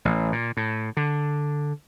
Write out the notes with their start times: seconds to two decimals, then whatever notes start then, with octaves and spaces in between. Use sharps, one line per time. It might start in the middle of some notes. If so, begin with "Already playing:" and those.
0.05 A1
0.32 A#2
0.57 A2
0.97 D3